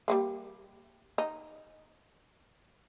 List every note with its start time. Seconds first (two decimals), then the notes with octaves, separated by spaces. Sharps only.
0.08 G3 A3 A#3
1.18 D#4